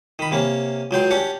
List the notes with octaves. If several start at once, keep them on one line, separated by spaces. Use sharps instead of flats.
D#3 B5
C3 A#3 C#4
C#2 F#3 G5 C6
C#4 D4 G4 F#5